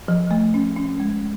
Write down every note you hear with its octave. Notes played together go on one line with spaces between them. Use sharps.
F3
A3
C#4
C#4
G#3